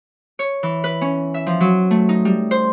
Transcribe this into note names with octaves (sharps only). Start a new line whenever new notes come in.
C#5
E3
B4
C#4
E5
F3
F#3
A3
D#4
G3
C5